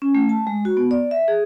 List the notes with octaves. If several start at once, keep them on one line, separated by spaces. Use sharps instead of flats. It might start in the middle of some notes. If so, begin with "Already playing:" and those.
C#4
A3
A5
G#3
F#4
B3
D5
E5
G#4